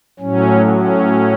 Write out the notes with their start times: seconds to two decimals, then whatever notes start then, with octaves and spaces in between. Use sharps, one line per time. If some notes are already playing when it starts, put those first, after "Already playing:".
0.19 A2 F#3 C#4
0.66 C#4